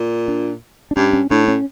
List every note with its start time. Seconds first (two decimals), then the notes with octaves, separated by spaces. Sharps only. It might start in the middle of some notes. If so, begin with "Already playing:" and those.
Already playing: A#2
0.28 D4
0.91 D4
0.96 G2 C#4
1.13 C#4
1.31 A2 D4
1.48 C#4